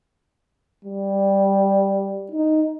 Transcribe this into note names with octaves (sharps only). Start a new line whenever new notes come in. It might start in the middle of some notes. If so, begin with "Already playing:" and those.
G3
D#4